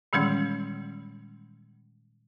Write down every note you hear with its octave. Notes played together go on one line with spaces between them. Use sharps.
A#2 D#3 E3 G3 G#3 C#4